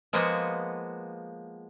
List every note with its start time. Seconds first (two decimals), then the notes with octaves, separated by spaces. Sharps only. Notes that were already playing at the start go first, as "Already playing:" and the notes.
0.13 F3 G#3 A#3 B3 F#4